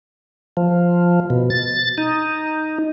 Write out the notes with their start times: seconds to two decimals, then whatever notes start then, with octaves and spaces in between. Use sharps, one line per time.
0.57 F3
1.30 B2
1.50 A6
1.98 D#4